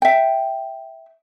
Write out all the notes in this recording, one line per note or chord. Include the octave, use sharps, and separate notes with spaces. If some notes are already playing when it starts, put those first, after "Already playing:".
E5 G5